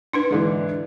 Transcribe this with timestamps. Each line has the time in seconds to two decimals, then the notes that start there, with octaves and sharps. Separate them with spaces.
0.13 D4 D#4 B4
0.31 G#2 D3 E3